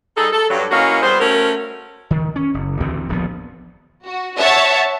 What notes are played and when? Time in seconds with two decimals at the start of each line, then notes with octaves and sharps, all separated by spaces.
0.17 G3 D#4 G#4 A4
0.33 A4
0.50 G2 F#3
0.71 E3 A#3 C#4 F#4 D#5 F5
1.02 G3 B3 G#4 C5
1.20 A3 C#4 F#4 A#4
2.11 D#3
2.36 C#4
2.54 F#1
2.80 D2 E3 C4
3.09 D1 A#1 F3 B3
4.06 F#4
4.40 C#5 E5 F#5 A5